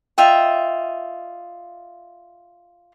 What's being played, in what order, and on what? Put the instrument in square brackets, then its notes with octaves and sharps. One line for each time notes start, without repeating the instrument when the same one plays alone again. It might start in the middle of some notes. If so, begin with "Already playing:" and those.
[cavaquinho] F4 D#5 E5 G5